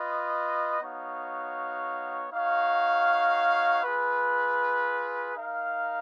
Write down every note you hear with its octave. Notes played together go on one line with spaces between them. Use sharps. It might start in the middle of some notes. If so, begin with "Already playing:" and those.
Already playing: F4 B4 D#5
B3 D#4 F#4 C#5 F5
D#4 F#4 C#5 F5
F4 G#4 B4
D#4 A#4 F5